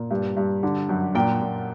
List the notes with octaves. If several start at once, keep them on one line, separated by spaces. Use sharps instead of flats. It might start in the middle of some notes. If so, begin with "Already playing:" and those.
Already playing: A#2
G2
G2
D3
F#2
A#2 G5
A#2